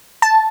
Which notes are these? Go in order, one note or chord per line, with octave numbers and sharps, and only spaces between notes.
A5